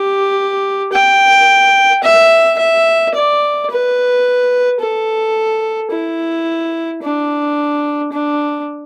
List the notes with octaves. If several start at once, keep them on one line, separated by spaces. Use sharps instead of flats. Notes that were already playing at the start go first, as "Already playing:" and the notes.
Already playing: G4
G5
E5
E5
D5
B4
A4
E4
D4
D4